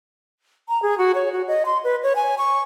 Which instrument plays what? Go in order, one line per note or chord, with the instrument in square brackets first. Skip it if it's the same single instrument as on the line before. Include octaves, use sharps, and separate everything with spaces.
[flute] A#5
G#4
F#4
C#5
F#4
D#5
C6
B4
C#5
G#5
C#6